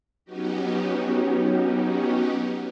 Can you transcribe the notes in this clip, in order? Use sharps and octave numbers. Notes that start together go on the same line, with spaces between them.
F#3 B3 C#4 D#4 F#4 G4